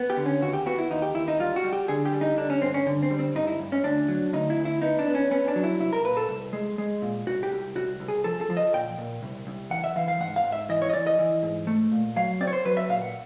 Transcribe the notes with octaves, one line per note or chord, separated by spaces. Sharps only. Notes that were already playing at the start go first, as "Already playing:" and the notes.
Already playing: B3
G4
D3
C#4
D#2 F#4
G4
B3 F#4
E4
D#2 D#4
G4
D#2 E4
D#4
G3 F4
F#4
G3
G4
D3 G#4
G4
G3
D#4
D3 D4
C#4
G2 C4
C#4
D3
C4
G3
C4
G2 D#4
E4
G2
C#4
D2 D4
F#3
D2 D#4
E4
D2
E4
B3 D#4
D4
B3
C#4
B3 C#4
D4
F#3
E4
C2 E4
A#4
A#2 B4
A4
C2
G#3
G#3
A#2
C2 F#4
G4
C2
C2 F#4
C2
G#4
F3 A4
A4
F3
D#5
A#2 G5
A#2
C2
C2
E3 F#5
E5
E3 F5
F5
G#2 F#5
F5
G#2
E5
E3 D#5
C#5
D#5
E3 D5
D#5
E3
G#2
A3
A#2
F#3 F5
C4 D5
C#5
C5
F#3 B4
E5
A#2 F5
F#5